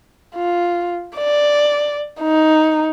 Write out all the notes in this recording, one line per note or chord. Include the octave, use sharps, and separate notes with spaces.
F4
D5
D#4